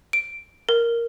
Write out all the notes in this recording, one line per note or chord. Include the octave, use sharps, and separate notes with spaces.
D7
A#4